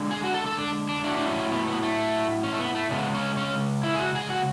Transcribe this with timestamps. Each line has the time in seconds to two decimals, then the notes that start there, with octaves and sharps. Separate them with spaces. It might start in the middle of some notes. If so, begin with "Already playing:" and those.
Already playing: D3 G#3
0.11 G#4
0.24 F#4
0.34 A4
0.46 A4
0.59 D4
0.89 D4
1.04 A2 F#3 A3 D4
1.17 D4
1.28 C#4
1.52 B3
1.67 B3
1.83 A3
2.43 C#4
2.52 A3
2.59 B3
2.75 A3
2.90 C#3 G#3 B3
3.14 C#4
3.37 C#4
3.83 E4
3.94 G#4
3.99 F#4
4.15 G#4
4.30 F#4